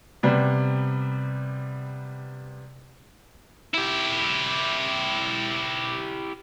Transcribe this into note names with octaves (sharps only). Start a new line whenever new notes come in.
C3 G3 B3
E4 G4